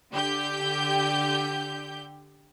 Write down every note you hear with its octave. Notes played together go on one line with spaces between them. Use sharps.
D3 G4 G6